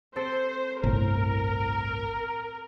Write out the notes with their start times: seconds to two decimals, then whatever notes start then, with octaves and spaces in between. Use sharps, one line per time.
0.16 C4 A4 C5
0.84 G1 C2 A2 A#4